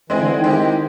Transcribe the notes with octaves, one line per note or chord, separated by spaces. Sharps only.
E3 G#3 C4 E4 G#4
D3
E3
D#3
G#3 C4 E4 G4